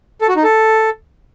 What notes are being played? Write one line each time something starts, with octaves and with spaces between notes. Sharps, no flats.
A4
F#4
D#4
A4